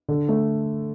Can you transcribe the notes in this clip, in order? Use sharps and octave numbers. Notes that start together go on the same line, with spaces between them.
D3
A3